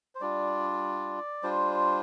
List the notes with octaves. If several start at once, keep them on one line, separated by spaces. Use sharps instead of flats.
C5
G3 D4 F4 D5
G3 D4 F4 C5